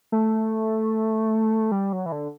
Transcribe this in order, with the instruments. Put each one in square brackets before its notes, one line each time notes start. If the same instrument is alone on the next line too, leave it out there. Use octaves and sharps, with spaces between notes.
[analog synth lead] A3
G3
F#3
E3
D3